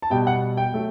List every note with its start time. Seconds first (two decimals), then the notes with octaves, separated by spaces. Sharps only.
0.02 A5
0.10 B2 G3 G5
0.27 F#5
0.57 G5
0.74 F#3 A3